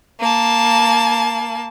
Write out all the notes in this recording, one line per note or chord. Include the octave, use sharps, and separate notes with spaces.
A#3 A5